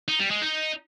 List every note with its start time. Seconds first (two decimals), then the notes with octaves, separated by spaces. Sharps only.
0.08 D#4
0.19 G3
0.31 G#3
0.42 D#4